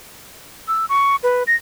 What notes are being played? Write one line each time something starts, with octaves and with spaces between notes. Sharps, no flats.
E6
C#6
B4
A#6